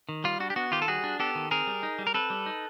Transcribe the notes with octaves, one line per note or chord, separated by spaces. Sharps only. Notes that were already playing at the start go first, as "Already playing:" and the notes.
D#3
G3 F4
D4 F#4
G4
B3 F#4
D#3 F4 G4
A4
G3 F#4 G#4
D4
B3 G4 A4
D#3
C4 G#4 A#4
G3
D#4
G3
A#4
C4 A4 B4
G3
D#4